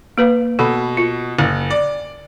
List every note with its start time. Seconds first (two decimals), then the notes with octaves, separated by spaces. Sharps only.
0.18 A#3 B4 F5
0.59 B2 A4 B5
0.97 F4
1.39 F#1
1.70 D5